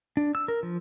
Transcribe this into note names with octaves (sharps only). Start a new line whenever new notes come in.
D4
E6
A#4
F3